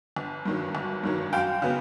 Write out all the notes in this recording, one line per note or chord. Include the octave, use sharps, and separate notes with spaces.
G1
G2 D#3 F#3
G1
G2 D#3 F#3
F#2 F5 G5
C#3 F#3 B3